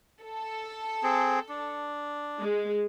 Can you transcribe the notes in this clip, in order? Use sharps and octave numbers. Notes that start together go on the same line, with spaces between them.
A4
C4 G#4
D4
G#3